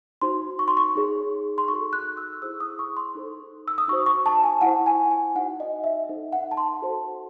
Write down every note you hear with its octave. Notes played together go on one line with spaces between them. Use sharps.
D#4 F#4 C5 C6
C#6
C6
C#6
D#4 G#4 C#5
C6
D#4 F#4 A4 C#6
F#6
E6
E4 G#4 C5 E6
D#6
C#6
C6
D#4 A4 C5
E6
D#6
D#4 F#4 C5 C#6
C#6
A5
G#5
E4 C5 F#5
G#5
G#5
D#4 F#4 C5 F#5
D#5
E5
D#4 A4 C5
F#5
A5
C6
F#4 A4 C5